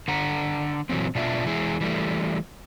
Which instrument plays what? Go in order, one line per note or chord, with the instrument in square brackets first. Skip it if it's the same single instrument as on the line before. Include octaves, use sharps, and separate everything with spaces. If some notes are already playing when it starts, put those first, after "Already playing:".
[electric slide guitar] D3 F#5 A#5
A#2 E3 F#3 G#3 C4
B2 B3 D4 F4 E5
E3 G#3 E4 G#4
E3 G3 A3